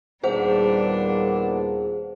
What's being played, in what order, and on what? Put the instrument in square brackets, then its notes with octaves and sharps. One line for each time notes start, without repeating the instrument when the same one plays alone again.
[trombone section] D#2 A#2 B3 [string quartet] G3 D4 [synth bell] G#4 C5 F#5